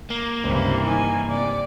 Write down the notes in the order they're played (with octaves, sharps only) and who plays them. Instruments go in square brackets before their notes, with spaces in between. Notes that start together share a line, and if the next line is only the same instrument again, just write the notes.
[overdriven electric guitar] A#3
[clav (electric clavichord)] C#2 [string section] G2 C3 E3 [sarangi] C5
[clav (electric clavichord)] D#3 [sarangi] G#5
[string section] C3 [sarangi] D5